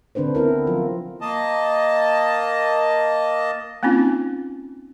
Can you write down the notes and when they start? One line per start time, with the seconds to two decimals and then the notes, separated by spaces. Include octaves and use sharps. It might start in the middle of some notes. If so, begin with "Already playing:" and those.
0.15 D3 C4 D4 B4 C5
0.35 B3 C4 E4 A#4
0.67 F3 F#3 F4
1.21 A#3 D#5 A5
3.83 A#3 C4 C#4 D#4 F4